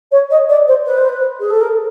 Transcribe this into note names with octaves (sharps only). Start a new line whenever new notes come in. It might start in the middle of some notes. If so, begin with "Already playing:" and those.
C#5
D#5
D5
C5
B4
C5
B4
G#4
A4
A#4